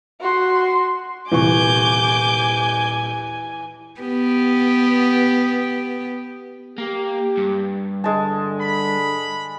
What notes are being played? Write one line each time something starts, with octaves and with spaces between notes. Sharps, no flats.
F#4 C6
D#1 C3 E3 G#5 C#6 D6 G6
B3 G4
A#3 G4
G2
D3 G#3 A5
B5